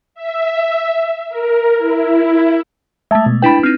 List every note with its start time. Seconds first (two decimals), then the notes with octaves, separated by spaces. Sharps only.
0.15 E5
1.29 A#4
1.77 E4
3.11 G#3 A3 E5 A5
3.26 B2
3.42 D4 E4 B4 G5 B5
3.63 C4 D#4 F6